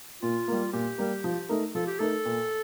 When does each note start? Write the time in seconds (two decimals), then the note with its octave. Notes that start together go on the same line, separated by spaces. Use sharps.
0.22 A#2 F4
0.48 G3 A#3
0.73 A#2 G4
0.98 G3 A#3
1.24 F3
1.49 A3 D#4 A#4
1.75 F3 A4
1.87 G4
1.99 A3 D#4 A4 A#4
2.25 A#2